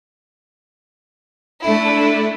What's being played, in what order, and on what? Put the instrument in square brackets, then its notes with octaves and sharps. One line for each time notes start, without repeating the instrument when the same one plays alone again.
[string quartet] A3 E4 [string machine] D4 A4